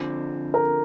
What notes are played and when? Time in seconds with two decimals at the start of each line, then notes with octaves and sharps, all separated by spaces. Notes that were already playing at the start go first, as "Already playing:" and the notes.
Already playing: D3 F3 C4
0.54 A#4